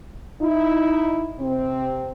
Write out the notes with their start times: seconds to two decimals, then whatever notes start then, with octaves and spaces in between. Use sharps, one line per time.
0.42 D#4 E4
1.39 C3 C4